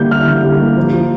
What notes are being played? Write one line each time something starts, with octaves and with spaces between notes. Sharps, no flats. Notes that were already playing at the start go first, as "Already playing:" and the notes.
Already playing: D3 G3 A#3 E4 G6
E4 F6
D3
G3
A#3
F3
F3